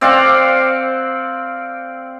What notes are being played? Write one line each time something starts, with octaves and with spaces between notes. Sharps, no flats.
C4 D5 F5 F#5